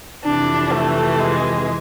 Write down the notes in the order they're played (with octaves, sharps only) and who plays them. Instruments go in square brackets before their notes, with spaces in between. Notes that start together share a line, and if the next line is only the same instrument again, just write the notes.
[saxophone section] F2 C3 E3 [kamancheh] D4
[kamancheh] A3
G#3